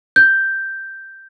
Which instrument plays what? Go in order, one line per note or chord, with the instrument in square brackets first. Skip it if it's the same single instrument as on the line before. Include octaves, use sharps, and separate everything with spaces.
[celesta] G6